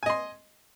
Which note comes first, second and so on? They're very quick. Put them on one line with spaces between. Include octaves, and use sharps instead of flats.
G#5 D#5 C6